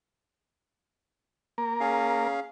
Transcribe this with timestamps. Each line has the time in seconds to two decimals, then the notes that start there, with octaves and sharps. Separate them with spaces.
1.58 A#3 A#4
1.80 C#4 G#4 F5